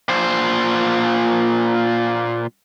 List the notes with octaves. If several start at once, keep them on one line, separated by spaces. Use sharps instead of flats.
A#2 C5